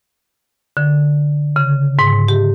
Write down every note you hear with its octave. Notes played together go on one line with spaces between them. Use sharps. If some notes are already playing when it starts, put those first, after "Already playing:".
D3
C#3
G#2
G4